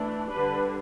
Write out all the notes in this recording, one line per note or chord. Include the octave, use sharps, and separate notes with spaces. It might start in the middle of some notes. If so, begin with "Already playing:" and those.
Already playing: E3 A3 D4
D3 G3 D4 B4